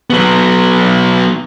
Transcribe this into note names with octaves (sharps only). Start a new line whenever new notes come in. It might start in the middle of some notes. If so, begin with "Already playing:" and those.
F#3 B3